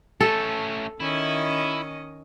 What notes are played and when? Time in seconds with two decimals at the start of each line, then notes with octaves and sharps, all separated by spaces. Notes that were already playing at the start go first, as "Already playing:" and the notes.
0.21 A3 C#4 A4
1.00 D#3 C#4 E4 D#5